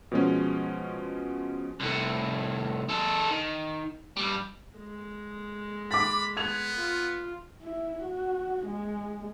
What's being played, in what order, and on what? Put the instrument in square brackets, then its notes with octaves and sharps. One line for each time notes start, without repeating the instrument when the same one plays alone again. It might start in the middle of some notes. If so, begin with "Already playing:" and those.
[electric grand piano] B2 F3 G#3 C#4
[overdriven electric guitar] C2 A2
G#3 A4
D#3
G2 G3
[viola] G#3
[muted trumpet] B5 [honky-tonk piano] D6 A6
[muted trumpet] B3 [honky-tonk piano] G#6 F7
[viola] F4
[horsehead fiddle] E4
F#4
G#3